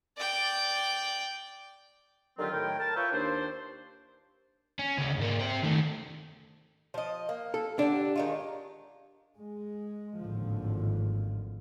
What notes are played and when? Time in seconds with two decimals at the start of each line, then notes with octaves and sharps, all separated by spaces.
0.17 D5 G5
2.38 D3 D#3 F#3 C4 F4 G4
2.52 A2 D#3 E4 A#4 G5
2.79 A#4 A5
2.95 F4 B4 C#5 E5 G5 C#6
3.12 D#2 D4 C5
4.79 C#4
4.98 D2 C#3
5.18 G#2 A#3
5.40 G4 C5
5.63 D#3 A3
6.94 F3 D#5
7.29 A#3
7.54 A4
7.79 D3 D4 G4 F#5
8.16 D#3 G#3 F4
9.37 G#3
10.19 G#1 D#2 A2 D3 F3